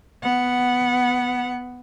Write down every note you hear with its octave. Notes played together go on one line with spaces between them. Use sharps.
B3 F#5